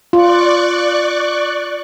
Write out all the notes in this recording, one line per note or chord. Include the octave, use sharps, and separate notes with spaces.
F4 D5 C#6 F#6